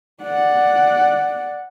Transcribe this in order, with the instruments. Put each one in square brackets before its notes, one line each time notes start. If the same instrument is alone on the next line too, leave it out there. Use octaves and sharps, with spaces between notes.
[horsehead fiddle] D5 F#5